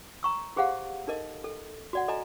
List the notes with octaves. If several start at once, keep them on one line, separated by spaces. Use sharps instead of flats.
A#5 C#6 E6
G4 G#4 C5 F5 F#5
D#4 A4 A#4 D#5
A4
F#4 D5 F#5
A4 D#5 G#5 A#5